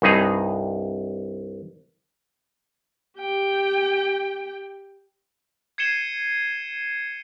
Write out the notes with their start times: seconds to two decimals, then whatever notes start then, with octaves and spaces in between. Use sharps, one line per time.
0.02 C2 G2 D#4 G#4
3.18 G4 G5
5.78 G#6 C7 C#7 D#7 E7 G7